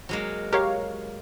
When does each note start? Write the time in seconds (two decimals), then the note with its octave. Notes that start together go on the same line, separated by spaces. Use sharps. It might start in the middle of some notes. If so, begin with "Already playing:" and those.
0.09 F#3 G#3 A#3
0.53 G4 A#4 C#5 F5